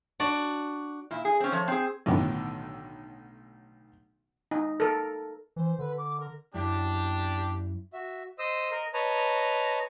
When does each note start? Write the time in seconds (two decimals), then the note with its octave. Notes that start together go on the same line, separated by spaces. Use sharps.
0.20 D4 F#4 D5
1.11 A#2 E4
1.25 G#4
1.40 C4 C#4
1.52 F3 A3 C#5
1.68 C4 G#4
2.06 B1 A2 D3 D#3 B3
4.51 D#4
4.80 A4 A#4
5.56 E3 C5
5.79 D3 B4
5.97 D6
6.19 A#4
6.54 F#2 D4 E4 G4
7.93 F#4 E5
8.39 C5 D#5 D#6 E6
8.71 A#4 D#5
8.94 B4 C#5 D#5 A5 A#5